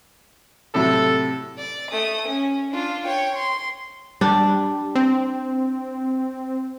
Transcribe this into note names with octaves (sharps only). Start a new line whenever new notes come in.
A2 C3 F#3 A4
D5
A3 D#6
C#4
D4 F4
C#5 G5
C6
G3 D4
C4